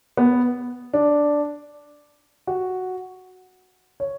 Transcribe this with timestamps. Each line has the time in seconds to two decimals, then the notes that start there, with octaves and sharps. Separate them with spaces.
0.17 B3
0.94 D4
2.47 F#4
4.00 C#5